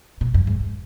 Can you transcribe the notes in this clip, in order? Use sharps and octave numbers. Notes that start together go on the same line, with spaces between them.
B2
F#2
G#2